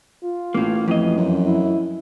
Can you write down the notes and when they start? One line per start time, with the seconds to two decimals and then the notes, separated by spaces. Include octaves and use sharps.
0.24 F4
0.54 A1 A2 A#3
0.88 F2 E3 D#5
1.17 F#2
1.46 E4